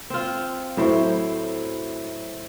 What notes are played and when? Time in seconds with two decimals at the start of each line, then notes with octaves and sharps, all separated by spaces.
0.10 C4 F4
0.77 A2 F#3 E4 C5